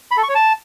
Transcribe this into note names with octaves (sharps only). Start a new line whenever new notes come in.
B5
A4
C#6
C#5
A5